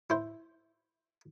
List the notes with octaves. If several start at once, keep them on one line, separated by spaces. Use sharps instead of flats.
E4 C5